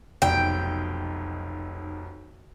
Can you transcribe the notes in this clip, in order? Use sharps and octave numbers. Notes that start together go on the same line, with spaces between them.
F1 B1 G5